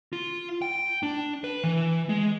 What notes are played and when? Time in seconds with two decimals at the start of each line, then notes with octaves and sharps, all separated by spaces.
0.13 F4
0.62 G5
1.03 D4
1.44 B4
1.64 E3
2.09 G#3